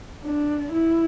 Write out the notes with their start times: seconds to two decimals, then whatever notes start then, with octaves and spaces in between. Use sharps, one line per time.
0.24 D4
0.73 E4